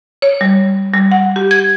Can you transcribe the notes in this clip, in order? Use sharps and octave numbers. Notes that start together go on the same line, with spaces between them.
C#5
G3
G3
F#5
G4
G#6